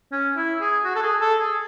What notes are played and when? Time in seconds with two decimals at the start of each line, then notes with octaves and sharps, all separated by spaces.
0.12 C#4
0.36 E4
0.61 G#4
0.84 F#4
0.96 A4
1.03 G#4
1.21 A4
1.39 G#4